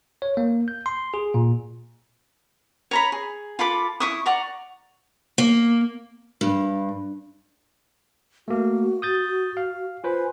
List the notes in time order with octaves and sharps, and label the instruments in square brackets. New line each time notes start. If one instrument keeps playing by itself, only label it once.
[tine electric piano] C#5
A#3
G6
C6
G#4
A#2
[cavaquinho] C#5 A#5 B5
G#4
F4 A4 B5 D6
E4 C#6 D#6
D5 F#5 A#5 C#6
[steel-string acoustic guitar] A#3
G2
[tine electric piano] A3 A#3 [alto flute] F#4
[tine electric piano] D#6 G6 A6
F5
[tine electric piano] F4 B4 C5 [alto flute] G#5